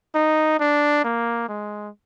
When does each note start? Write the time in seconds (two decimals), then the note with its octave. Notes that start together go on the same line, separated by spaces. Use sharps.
0.15 D#4
0.60 D4
1.04 A#3
1.49 G#3